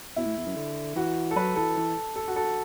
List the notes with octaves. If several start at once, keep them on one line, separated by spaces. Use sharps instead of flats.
B2 E4
A2
E2
F#2
D3
E3 F#4
A4
F#3 B4
E3 A4
E3
A4
F#4
A4